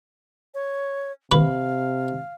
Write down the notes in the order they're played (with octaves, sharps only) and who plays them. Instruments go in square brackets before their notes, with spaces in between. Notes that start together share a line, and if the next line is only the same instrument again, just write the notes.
[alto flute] C#5
[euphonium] C3 [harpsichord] B4 [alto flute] F5